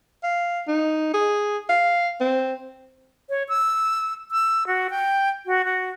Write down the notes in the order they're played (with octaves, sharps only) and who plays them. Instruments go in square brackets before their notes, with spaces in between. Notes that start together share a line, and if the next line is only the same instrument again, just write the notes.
[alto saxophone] F5
D#4
G#4
F5
C4
[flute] C#5
E6
E6
F#4
G5
F#4
F#4